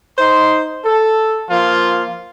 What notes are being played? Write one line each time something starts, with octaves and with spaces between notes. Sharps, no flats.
D#4 C5 C6
A4
F3 A#3 F4